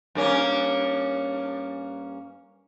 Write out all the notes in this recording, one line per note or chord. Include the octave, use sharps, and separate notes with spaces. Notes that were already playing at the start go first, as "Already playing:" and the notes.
G2 A#3 C#4